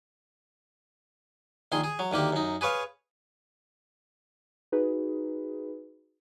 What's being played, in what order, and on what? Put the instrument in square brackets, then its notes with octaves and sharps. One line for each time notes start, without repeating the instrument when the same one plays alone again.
[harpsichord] A#1 D#3 G#4 C6
G#4
F#3
D2 D#3 A#3 G4
F#2 D#4
G#4 B4 C#5 F5
[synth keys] D#4 F#4 G#4 B4